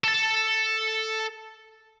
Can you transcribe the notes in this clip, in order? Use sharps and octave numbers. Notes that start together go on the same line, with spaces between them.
A4 A5